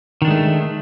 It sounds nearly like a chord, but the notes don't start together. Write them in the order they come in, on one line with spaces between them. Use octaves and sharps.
D#3 D4 G#3 A3